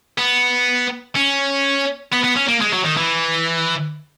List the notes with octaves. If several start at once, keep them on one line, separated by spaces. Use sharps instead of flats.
B3
C#4
B3
B3
C#4
A#3
G#3
F#3
D#3
E3